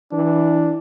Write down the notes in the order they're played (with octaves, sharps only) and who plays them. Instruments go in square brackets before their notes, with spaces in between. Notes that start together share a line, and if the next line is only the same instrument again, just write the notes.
[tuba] E3 [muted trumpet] D4